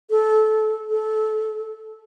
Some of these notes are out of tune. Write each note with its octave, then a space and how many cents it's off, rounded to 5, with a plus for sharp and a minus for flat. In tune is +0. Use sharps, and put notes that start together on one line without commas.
A4 -20
A4 -20